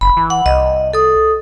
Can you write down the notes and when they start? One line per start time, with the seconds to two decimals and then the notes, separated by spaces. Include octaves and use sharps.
0.01 F#1 B5
0.17 E3
0.30 F#5
0.46 C2 D#5
0.93 A4 D#6